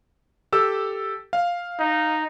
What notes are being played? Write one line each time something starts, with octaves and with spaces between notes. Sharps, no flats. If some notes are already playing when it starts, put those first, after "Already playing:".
G4 A4 E6
F5
D#4